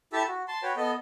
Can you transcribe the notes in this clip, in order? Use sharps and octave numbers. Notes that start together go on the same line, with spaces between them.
E4 G4 A4 E5 A5 E6
F#4
A5 C6
F#4 B4 C#5 G5
B3 A4 D#5